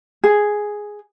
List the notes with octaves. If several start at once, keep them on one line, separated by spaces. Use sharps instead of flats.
G#4